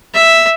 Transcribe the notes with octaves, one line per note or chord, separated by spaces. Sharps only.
E5